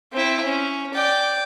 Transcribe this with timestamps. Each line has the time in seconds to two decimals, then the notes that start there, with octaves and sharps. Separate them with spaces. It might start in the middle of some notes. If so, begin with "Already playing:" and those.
0.12 C4 E4
0.44 C#4
0.93 D5 G5